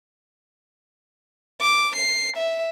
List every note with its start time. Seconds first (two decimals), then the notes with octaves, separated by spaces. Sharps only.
1.61 D6
1.96 C7
2.37 E5